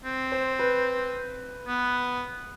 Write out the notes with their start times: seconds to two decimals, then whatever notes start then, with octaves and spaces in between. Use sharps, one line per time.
0.05 C4
0.32 C5
0.59 B4
1.68 B3